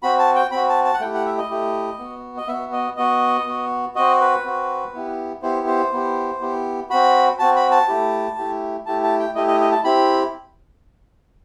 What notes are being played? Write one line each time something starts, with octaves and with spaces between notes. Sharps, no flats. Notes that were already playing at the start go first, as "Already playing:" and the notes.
C4 F#4 B5
A5
G5
C4 F#4 B5
A5
A5
F#5
A3 E4 G4 G5
F#5
E5
D#5
A3 E4 G4
B3 F#4
D#5
B3 F#4 E5
D#5
B3 F#4 D#5
B3 F#4
C4 F#4 D#5
B4
C4 F#4
B3 E4 G4
B3 E4 G4 C5
C5
B3 E4 G4
B3 E4 G4
C4 F#4 B5
C4 F#4 A5
B5
A5
A3 E4 G4
A3 E4 G4
A3 E4 G4 A5
A5
G5
A3 E4 G4 D#5
D#5
D#5
A5
C4 E4 G4 B5